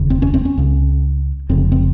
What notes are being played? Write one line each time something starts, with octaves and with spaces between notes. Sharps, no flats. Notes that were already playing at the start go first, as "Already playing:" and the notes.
Already playing: F1 D#2 C#3
C4
C#4
C4
C#4
C#2 C#3
F1 F2 C#3 C4
C4